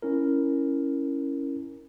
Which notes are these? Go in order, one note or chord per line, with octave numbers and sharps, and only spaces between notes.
C#4 E4 A#4